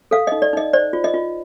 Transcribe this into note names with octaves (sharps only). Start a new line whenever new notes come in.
A4 F5
D#4 D#5
D5
D#4 D#5
C5 D5
F4
D#5
F4